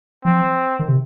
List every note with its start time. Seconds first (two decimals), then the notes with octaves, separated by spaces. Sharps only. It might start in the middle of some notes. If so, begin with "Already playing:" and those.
0.25 F3 C4
0.79 D#3
0.88 C3